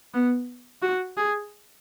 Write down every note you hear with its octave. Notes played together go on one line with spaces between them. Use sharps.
B3
F#4
G#4